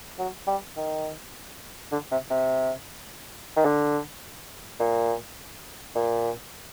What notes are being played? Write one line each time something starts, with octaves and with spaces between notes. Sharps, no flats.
F#3
G3
D#3
D3
C3
C3
D#3
D3
A#2
A#2